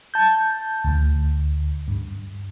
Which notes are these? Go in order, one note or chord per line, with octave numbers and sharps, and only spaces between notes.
A5 G6
D2
G2